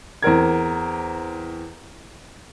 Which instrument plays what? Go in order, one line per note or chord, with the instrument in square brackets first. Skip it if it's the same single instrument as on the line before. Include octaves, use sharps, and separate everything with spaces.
[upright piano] E2 C4 A#4 G#6